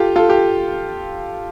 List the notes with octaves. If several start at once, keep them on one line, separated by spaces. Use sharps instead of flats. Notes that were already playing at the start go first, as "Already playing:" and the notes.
Already playing: F4 G4 A4
F4 A4
G4